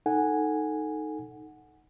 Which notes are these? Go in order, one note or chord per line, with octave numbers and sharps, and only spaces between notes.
D#4 A4 F#5 G#5